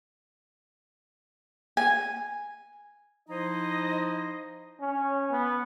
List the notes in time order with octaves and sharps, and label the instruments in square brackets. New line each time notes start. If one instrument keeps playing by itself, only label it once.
[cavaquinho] G#5
[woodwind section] F3 D#4 E4 C5 D#5
[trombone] C#4
B3